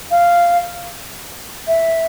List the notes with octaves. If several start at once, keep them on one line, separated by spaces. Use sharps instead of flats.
F5
E5